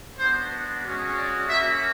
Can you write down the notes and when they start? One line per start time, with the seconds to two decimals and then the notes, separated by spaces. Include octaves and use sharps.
0.17 B3 D4 F#4 C5
0.84 G#3 C#4 F#4
1.16 D5
1.48 A#3 C#4 F#4 E5